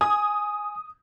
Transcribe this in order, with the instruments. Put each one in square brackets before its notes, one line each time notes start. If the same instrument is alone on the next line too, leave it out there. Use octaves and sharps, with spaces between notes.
[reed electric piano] G#5 [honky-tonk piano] D#6